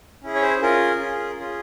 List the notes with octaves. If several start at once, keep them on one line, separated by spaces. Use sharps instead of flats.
C#4 E4 G#4
C#5
C5
C#4 F4 G#4 A#4
C#4 F4 G#4
C#4 F4 G#4